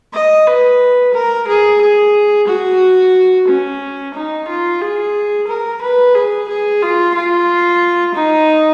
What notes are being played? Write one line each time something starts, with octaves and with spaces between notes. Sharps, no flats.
D#5
B4
A#4
G#4
G#4
F#4
C#4
D#4
F4
G#4
A#4
B4
G#4
G#4
F4
F4
D#4